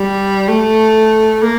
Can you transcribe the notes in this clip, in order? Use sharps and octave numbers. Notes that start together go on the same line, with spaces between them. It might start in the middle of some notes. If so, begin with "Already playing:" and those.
Already playing: G3
A3
A#3